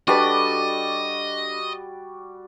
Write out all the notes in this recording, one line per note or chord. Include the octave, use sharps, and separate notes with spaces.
G3 D4 F#4 A4 B4 D5 D#5